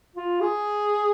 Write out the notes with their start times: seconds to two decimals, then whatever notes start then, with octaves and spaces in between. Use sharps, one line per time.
0.16 F4
0.41 G#4